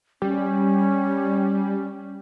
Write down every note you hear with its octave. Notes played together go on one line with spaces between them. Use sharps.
G3 C#4